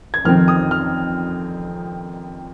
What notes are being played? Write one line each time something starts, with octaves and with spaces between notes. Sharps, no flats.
G#6
F2 D#3 C4 F6
D#6
F6